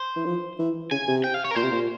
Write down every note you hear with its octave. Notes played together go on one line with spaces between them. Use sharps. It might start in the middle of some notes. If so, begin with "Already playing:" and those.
Already playing: C5
E3
F3
E3
C#3 G#5
C3
G5
F5
C#5
A#4
A#2 C5
C3
A#2